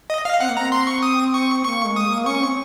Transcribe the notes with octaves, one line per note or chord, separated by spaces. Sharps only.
D#5
F5
C4 F#5
A#3
C4 A#5
C6
C#6
D#6
C#6
A#3 C#6
G#3
D#6
A#3
C#4 C#6
C4